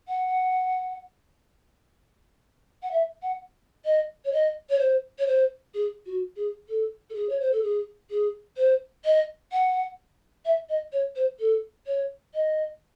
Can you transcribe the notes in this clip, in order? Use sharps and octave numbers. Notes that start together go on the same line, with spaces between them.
F#5
F#5
E5
F#5
D#5
C#5
D#5
C#5
C5
C#5
C5
G#4
F#4
G#4
A4
A4
G#4
C#5
C5
A4
G#4
G#4
C5
D#5
F#5
E5
D#5
C#5
C5
A4
C#5
D#5